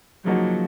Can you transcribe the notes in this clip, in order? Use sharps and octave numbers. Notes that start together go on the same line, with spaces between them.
C#3 F3 F#3 A#3 D#4 F#4